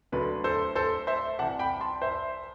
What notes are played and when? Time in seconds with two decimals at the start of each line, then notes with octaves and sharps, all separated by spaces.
0.12 D2 D3 F#3 B4
0.44 A4 C5
0.75 A4 C5
1.07 C5 E5
1.39 C2 C3 E3 F#5 A5
1.59 G5 B5
1.81 A5 C6
2.02 C5 E5